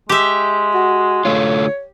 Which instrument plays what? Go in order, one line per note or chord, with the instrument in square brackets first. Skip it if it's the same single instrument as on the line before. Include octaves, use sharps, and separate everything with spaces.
[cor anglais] G#3 [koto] G4 E5
[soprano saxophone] F#4
[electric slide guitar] D3 A3 F4 [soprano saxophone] C#5